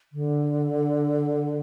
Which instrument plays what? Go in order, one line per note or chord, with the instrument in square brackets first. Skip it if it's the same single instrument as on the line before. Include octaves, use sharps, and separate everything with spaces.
[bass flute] D3